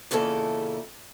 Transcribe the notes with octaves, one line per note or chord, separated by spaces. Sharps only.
E2 A#2 C#3 D#4 E4 A4